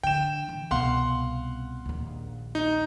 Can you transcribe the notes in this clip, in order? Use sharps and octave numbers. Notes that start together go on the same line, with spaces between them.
D3 G5 E7
E3
C2 B2 F5 F#5 C6
A#1 D#2
D#4